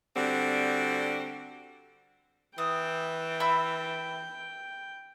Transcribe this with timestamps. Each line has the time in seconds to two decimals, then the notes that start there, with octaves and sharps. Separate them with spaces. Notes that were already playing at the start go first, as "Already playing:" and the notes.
0.15 D3 G3 C4 F#4
2.58 E3 G5 D#6
3.40 E5 B5 E6